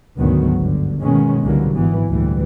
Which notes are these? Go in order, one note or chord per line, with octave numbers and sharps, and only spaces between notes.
D2 G#2 B2 D#3 F#3 B3
G1 D3
B2 D#3 G#3 B3 C#4
C#2 D3 E3 F#3 G3 A#3
G#1 E3 B3
D2 A#2 E3 G3